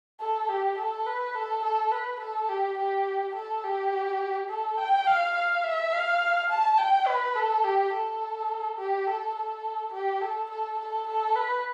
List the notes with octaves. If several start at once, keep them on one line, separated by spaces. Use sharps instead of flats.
A4
G4
A4
B4
A4
A4
B4
A4
G4
G4
A4
G4
A4
G5
F5
F5
E5
F5
A5
G5
B4
A4
G4
A4
G4
A4
A4
G4
A4
A4
A4
A4
B4